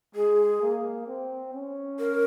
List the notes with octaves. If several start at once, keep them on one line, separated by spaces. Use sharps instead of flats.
G#3 G#4
A#3
C4
C#4
A#4